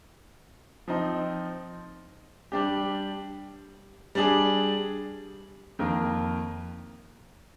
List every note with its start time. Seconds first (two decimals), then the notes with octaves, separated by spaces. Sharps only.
0.88 F3 C4 D#4
2.52 G3 D4 G4
4.15 G3 D4 G#4
5.79 F2 D#3 A#3